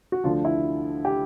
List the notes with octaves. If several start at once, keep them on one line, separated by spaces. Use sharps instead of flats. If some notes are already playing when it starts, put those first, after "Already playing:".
F#4
D2 D3 F3 F4
E4
G4